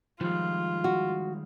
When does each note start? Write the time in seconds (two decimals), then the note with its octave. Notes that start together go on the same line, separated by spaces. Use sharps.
0.21 D#3 F3 G3 G#3 F4
0.84 F#4